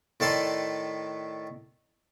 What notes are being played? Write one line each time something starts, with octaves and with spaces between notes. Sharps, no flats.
A2 D#3 A3 D5 A5 C6